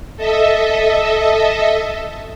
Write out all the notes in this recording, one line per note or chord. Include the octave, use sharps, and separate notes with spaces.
A4 D#5 E5